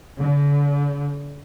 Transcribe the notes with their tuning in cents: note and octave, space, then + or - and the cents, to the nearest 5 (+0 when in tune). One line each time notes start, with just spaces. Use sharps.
D3 -40